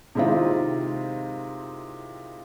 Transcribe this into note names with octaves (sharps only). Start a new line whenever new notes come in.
C3 D#3 G#3 C4 E4 F4